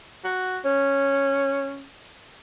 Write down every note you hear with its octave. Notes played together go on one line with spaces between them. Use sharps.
F#4
C#4